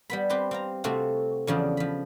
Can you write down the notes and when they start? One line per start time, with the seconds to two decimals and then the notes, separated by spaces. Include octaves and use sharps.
0.10 G3 B3 B5
0.29 C4 G4 B4 C5
0.51 C4 F5 A#5
0.84 C3 A3 C4 F4 F#4
1.47 E2 C#3 F3 D4
1.77 F3 B5